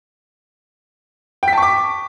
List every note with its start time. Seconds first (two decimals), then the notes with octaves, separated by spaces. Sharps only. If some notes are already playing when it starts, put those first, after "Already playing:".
1.43 G5
1.48 B6
1.53 A5
1.57 C#6
1.62 D6